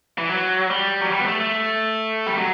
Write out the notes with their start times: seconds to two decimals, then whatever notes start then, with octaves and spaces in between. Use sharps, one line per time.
0.18 E3
0.29 F#3
0.70 G3
1.01 F#3
1.12 G3
1.20 B3
1.26 A3
1.40 A3
2.27 G3
2.38 F#3